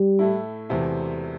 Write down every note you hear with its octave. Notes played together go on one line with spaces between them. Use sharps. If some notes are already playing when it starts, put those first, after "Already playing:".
Already playing: G3
A2 A3 E4
E1 E2 C3 A3 C4